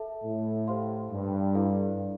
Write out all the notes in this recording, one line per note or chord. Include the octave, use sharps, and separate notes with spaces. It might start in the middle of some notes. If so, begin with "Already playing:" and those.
Already playing: A4 E5 A5
A2
G4 C5 F5 C6
G2
E4 A4 D5 F5